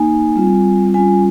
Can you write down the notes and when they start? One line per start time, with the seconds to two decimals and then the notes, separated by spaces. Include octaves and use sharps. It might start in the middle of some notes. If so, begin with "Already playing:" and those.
Already playing: A#3 D#4 G#5
0.36 G3 C4 F4
0.94 G3 C#4 F4 G#5